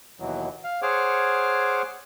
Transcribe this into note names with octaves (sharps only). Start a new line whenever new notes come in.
D#2 B2 E3 F#3
F5
G#4 C5 C#5 F#5 D6 F6